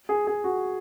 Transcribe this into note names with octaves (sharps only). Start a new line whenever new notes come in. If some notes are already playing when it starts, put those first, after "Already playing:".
G#4
G#4
F#4